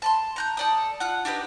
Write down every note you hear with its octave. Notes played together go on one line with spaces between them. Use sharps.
A5 B5 C6
A#5 F#6 G6
A4 D5 D#6
F4 F#5
D4 D#4 G4 B4